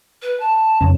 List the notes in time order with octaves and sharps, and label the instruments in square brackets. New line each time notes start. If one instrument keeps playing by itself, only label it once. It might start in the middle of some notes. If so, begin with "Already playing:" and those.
[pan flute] B4
A5
[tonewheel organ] F2 C#3 C#4